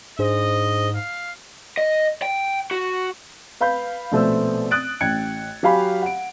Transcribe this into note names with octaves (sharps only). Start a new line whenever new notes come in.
G#2 D4 G#4 C5 D#5
F5
D#5
G5
F#4
B4 F5 B5 G6
A#1 B2 A3 B3 C4 E6
D#6 F#6 A6 D7
A1 G5 G#6 C#7
F#3 G4 F5 G#5 B5
F#5 D7